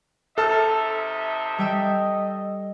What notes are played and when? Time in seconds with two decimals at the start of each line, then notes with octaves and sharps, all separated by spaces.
0.38 C3 D#4 A4 E5 A5 F6
1.58 G3 D#5 G5 E6